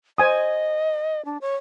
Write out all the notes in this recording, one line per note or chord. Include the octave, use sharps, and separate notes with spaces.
C5 D#5 G#5 D#6
D4
C#5